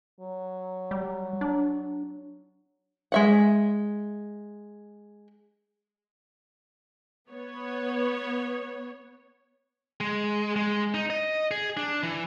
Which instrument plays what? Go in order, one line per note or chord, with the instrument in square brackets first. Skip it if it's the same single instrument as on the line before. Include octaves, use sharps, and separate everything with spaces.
[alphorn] F#3
[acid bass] G3
D4
[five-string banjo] G#3 E5 F#5
[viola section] B3 C#5
[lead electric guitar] G#3
G#3
D#4
D#5
G#4
D4
E3